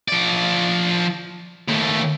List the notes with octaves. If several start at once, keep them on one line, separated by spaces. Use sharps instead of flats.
F3 D5
D#2 A3